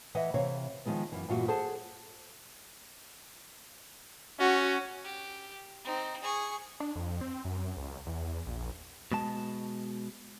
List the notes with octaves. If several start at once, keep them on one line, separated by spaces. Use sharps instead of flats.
E3 B4 D#5 E5 F#5
C3 E3 B4 C#5 F5
D#3 F3 G#3 B3
F#2 E3
G2 A#2 E3 G3 F4 F#4
G#4 A4 C5 F#5 A5
C#4 F#4
G4
C4 D#4
G#4 C#6
D4
F2
C4
F#2
C#2
E2
A#1
B2 G#3 A5